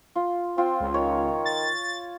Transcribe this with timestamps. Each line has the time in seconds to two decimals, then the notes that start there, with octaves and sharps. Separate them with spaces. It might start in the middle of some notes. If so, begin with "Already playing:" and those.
0.16 F4
0.58 C4 F4
0.80 C#2
0.94 D#3 C#5
1.45 A6